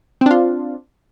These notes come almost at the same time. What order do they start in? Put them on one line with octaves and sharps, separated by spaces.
C4 D4 F4